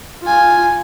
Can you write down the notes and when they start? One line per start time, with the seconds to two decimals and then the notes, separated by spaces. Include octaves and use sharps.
0.24 F4 G#5